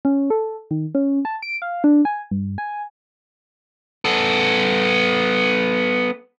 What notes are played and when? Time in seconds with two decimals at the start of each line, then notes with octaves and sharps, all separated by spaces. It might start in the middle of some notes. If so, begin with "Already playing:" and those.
0.05 C#4
0.30 A4
0.71 D#3
0.95 C#4
1.25 A5
1.43 D7
1.62 F5
1.84 D4
2.05 G#5
2.31 G2
2.58 G#5
4.05 B3 A4